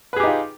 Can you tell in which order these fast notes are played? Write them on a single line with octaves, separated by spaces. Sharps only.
B4 G#4 G4 D#4 F4